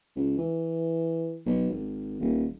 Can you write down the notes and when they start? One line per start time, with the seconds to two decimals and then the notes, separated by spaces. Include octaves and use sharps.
0.16 C#2
0.38 E3
1.46 B1
1.71 G#1
2.20 D#1